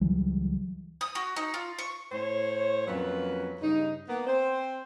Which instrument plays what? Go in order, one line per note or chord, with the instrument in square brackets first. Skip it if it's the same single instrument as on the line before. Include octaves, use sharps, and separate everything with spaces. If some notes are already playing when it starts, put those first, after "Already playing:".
[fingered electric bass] C#2 E3 F#3 G3
[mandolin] D#6
F#4
D#4
F4
C#6
[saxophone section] A2 C5 C#5
F2 F#3 A#3 C#4 B4
G2 C#3 D#4
A#3 B3
C4 C5